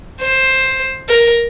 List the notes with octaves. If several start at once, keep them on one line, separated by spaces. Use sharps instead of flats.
C5
A#4